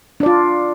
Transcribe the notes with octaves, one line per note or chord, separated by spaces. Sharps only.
D4 F4 D5